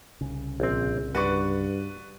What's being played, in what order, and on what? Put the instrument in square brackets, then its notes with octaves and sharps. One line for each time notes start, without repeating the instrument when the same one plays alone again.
[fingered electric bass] C2 C#3
[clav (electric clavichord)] A#1 C4
[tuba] G2 [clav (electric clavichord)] F#4 [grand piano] B4 D5 C#6